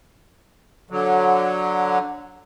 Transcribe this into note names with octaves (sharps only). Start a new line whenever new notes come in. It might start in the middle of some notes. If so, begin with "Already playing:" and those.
D3 F#3